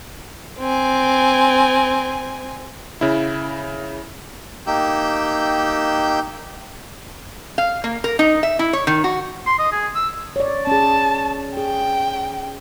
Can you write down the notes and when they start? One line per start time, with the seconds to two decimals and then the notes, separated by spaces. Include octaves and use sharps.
0.59 C4 G#5
3.01 C#3 E4
4.67 A#3 D#4 G4 G5 E6 G6
7.58 F5
7.84 A#3
8.04 A#4
8.19 D#4
8.43 E5
8.59 E4
8.73 C#5
8.87 D#3
9.04 F#4
9.47 C6
9.59 D#5
9.72 G#4
9.95 E6
10.36 C#5 D5
10.67 C#4 G#4 A5
11.57 G#4 G5